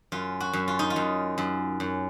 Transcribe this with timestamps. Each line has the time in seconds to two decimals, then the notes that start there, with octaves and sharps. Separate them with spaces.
0.12 F#2 F4
0.40 F#4
0.53 F#2
0.68 F4
0.79 D#4
0.90 F4
0.96 F#2
1.38 F#2
1.80 F#2